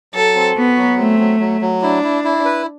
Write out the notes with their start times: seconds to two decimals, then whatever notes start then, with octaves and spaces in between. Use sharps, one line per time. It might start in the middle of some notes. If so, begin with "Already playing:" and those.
0.14 F#3 A4
0.35 C4
0.56 B3 F#4
0.77 F#3
0.98 A3 C4
1.19 F#3
1.40 F#3
1.61 F#3
1.82 D4 E4
2.03 E4
2.24 E4
2.45 B4